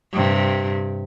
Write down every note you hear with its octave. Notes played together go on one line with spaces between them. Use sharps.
G2 C3